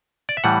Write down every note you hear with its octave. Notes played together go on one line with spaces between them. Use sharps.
D5
E5
A2 E3 G3 F#5